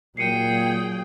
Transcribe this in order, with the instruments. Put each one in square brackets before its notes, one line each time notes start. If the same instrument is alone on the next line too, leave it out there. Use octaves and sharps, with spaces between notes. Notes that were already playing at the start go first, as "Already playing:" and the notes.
[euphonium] A#2 [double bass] F#3 [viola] G#4 G5 [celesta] C7 C#7 D#7